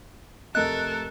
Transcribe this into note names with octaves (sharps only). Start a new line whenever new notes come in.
F1 A3 A4 A#4 D#5 F#6